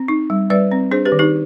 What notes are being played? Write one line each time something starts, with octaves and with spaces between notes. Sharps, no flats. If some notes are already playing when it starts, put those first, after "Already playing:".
Already playing: C4
D#4
G3
G3 B4 D5
C4
D4 G#4 C5
G4 B4
D#3
D#4 G4